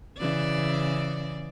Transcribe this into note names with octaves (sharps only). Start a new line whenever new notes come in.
C#3 E3 D5